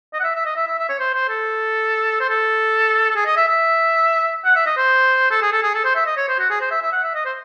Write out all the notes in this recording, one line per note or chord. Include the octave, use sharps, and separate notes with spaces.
D#5
F#5
E5
E5
D#5
E5
E5
E5
C#5
C5
C5
A4
C5
A4
A4
G#4
D#5
E5
E5
F#5
E5
D#5
C5
A4
G#4
A4
G#4
A4
C5
E5
D#5
C#5
C5
F#4
G#4
C5
E5
E5
F#5
E5
D#5
C5